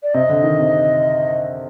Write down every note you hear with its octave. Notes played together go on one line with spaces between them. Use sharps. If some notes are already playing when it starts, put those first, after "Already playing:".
D5
C3 D#5
D3
D#3
C3